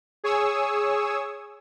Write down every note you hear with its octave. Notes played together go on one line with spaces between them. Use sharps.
G#4 C#5 G#5 C#6 D#6 E6